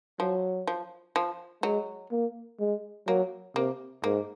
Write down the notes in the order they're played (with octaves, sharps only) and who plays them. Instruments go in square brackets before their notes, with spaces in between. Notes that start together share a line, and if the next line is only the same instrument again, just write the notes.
[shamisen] F3 [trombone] F#3
[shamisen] F3
F3
[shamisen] F#3 [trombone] G#3
[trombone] A#3
G#3
[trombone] F#3 [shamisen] A#3
[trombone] C3 [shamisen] A#3
[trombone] G#2 [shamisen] A#3